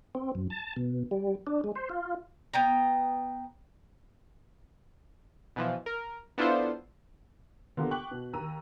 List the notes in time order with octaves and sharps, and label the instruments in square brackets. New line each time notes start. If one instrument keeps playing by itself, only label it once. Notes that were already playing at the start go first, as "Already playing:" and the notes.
[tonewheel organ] C4
F#2
A5
B2
G3
D4
G#3
C5
F4
[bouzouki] B3 G5 A#5
[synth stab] B2 E3 F3
A#4
B3 D4 E4 F4 A4 C5
[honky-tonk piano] D3 A#3 B3 F4 G4 A#4
G5 C#6 D6 F#6 B6 F#7
B2
D#2 A#5 E6 D#7